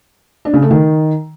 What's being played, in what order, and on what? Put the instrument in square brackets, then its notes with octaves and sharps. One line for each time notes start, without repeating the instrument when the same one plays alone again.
[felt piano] D4
C#3
A3
D#3